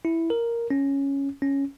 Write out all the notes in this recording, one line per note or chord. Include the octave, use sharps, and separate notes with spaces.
E4
A#4
C#4
C#4